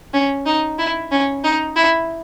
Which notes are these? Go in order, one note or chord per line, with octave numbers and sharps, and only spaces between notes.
C#4
D#4
E4
C#4
D#4
E4